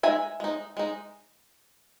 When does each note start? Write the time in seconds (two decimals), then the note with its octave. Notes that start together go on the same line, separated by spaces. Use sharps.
0.03 G#3 D#4 E5 G#5
0.40 G#3 D#4
0.77 G#3 D#4